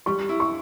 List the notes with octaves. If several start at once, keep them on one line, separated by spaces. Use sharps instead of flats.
G3 C#6
E4
C#6